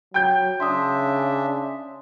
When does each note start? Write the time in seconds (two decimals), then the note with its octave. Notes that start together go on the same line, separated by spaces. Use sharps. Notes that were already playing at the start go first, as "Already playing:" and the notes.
0.14 F#3 G5 G6
0.60 C#3 D4 E5 C6 D#6